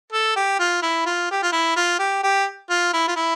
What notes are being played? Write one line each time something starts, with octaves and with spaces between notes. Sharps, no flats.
A4
G4
F4
E4
F4
G4
F4
E4
F4
G4
G4
F4
E4
F4
E4